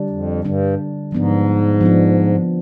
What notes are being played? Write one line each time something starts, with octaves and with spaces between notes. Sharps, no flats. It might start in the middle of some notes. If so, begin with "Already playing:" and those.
Already playing: D3 G3 D4
F2
G2 D3 G3 D4
G#2 F3 B3 D4
F3 B3 D4